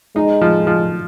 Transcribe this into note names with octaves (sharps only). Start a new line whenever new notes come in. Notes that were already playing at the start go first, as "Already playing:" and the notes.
G#3 D#4
F3
F3